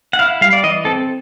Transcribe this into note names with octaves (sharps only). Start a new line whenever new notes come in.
F#5
E4 F5
G3 F5
D5
E3 D#5
C4 A4